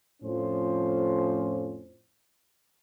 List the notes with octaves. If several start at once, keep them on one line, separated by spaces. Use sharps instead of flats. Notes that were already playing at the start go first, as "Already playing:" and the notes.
F2 A2 F3 C#4 C5